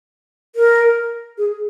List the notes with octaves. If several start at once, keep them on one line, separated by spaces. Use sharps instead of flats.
A#4
G#4